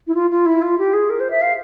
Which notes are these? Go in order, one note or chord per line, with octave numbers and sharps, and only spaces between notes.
E4
F4
F4
E4
F4
G4
G#4
A#4
C5
E5
F5